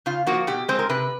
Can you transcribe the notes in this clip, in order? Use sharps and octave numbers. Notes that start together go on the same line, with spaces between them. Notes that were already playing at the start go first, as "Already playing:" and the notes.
C#3 F4
F3 A#3 F#4
B2 G4
G#3 C4 C5
A#4
C3 B4